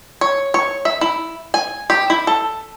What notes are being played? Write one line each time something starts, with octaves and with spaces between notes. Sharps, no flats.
C#5
C#5
E5
E4
G#5
G4
E4
A4